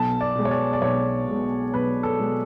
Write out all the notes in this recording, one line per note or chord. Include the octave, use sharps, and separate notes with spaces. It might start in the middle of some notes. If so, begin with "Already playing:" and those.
Already playing: B1 A5
D5
B2 G#3
C#5
D5
D5
B1 C#5
B2 G#3
B1 B4
A4
B2 G#3